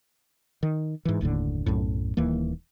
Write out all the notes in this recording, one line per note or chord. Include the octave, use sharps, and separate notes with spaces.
D#3
G#2 E3
F#1 D#2 A2 D3
B1 F#2 A2
D#1 D#2 E3 A#3